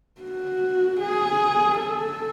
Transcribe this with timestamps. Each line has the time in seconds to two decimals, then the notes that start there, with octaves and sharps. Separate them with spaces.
0.21 F#4
1.01 G#4
1.79 A4